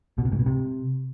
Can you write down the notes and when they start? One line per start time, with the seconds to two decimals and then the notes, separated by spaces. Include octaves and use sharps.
0.18 B2
0.25 C3
0.32 G#2
0.39 B2
0.46 C3